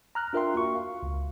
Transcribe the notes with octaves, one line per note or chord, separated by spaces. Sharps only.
A#5 F6 F#6
D4 F4 A#4 E5 G5 C6
A#3 F#4 C#6
F5
C#2